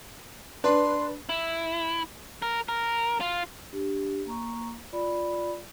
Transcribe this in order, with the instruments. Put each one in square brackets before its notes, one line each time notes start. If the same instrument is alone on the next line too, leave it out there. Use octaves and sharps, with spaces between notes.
[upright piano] D4 [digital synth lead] B4 [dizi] C6
[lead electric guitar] E4
A#4
A#4
F4
[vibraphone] D4 G4
A#3 A#5 C#6
F4 D5 B5